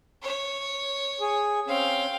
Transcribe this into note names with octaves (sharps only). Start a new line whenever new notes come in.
C#5
G#4
C4 C#4 F5 G5